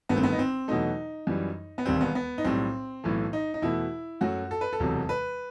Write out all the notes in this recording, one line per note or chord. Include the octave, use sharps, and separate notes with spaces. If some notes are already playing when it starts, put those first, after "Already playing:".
G1 G2 D#3 A3 B3
C4
B3
D#4
C4
E2 B2 F#3 A3 D#4
F#2 E3 G3
B3
E1 D#2 D#3 G3 C4
B3
B3
D#4
B1 A2 G3 C4
B1 A2 E3 A3
D#4
D#4
E2 B2 A3 E4
F#2 F#3 A3 F#4
A4
B4
A4
E1 E2 C3 F#3
B4